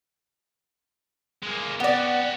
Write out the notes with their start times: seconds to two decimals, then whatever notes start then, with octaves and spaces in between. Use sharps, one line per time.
1.43 G#3 A#3
1.80 B3 F#4 G4 D5